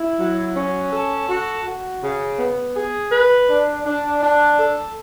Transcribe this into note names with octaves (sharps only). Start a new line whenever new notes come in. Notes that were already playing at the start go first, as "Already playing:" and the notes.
Already playing: E4
F#3
C#4
A4
F#4
F#4
C#3
B3
G#4
B4
D4
D4
D4
A4